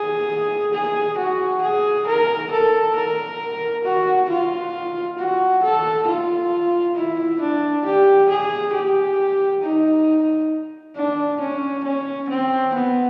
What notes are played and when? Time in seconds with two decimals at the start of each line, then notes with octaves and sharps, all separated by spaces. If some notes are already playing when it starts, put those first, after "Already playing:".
Already playing: G#4
0.73 G#4
1.18 F#4
1.62 G#4
2.07 A#4
2.51 A4
2.96 A#4
3.85 F#4
4.29 F4
5.18 F#4
5.63 A4
6.07 F4
6.96 E4
7.41 D4
7.85 G4
8.29 G#4
8.74 G4
9.63 D#4
10.96 D4
11.41 C#4
11.85 C#4
12.29 C4
12.74 B3